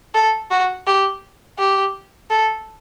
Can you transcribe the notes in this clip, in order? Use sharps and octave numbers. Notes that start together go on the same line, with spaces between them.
A4
F#4
G4
G4
A4